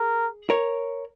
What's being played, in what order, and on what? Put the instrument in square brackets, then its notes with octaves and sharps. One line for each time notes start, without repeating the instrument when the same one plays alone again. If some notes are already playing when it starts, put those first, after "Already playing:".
Already playing: [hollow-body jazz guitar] G#4 [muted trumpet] A#4
[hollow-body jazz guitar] A#4 C#5